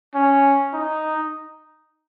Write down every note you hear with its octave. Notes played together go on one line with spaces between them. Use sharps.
C#4
D#4